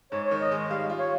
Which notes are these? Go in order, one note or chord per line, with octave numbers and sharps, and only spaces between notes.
G#2 C#5
D#3 C#5
D#5
G#3
G3 F5
F4
C#5